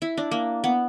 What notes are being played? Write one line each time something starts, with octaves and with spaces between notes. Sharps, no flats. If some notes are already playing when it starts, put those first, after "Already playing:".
E4
D4
A#3
B3